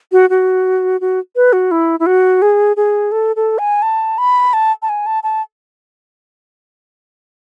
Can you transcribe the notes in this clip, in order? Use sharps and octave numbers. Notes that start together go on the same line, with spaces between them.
F#4
F#4
F#4
B4
F#4
E4
E4
F#4
G#4
G#4
A4
A4
G#5
A5
B5
A5
A5
G#5
A5
A5